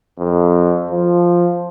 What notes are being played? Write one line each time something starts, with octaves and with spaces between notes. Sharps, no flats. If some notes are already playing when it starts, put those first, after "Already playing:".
F2
F3